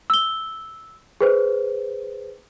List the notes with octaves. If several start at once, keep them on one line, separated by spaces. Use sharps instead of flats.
E6 G7
G#4 B4 C5